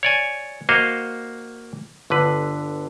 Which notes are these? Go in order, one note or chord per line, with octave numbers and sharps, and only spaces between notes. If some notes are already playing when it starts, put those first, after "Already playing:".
C#5 D5 G#5
A#3 F#4 C5 D#5 F5
G1 D3 B4